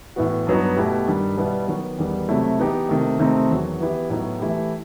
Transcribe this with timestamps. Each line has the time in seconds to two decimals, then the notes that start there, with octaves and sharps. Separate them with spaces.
0.16 A2 E3 B3 F#4
0.47 G2 F#3 B3 D#4
0.77 B2 A3 E4 G4
1.07 G2 D#3 G3
1.37 B2 G3 B3 E4
1.67 D#3 F#3 B3 F#4
1.98 E2 D#3 G3 B3
2.29 C3 F#3 A3 E4
2.59 E3 B3 D#4 G4
2.89 C3 D#3 A3
3.19 C3 D#3 A3 C4 D#4
3.50 E2 D#3 F#3
3.80 E3 B3 E4 G4
4.10 A2 F#3 B3 D#4
4.40 E3 A3 E4 G4